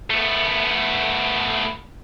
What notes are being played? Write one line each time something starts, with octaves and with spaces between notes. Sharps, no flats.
A3 B3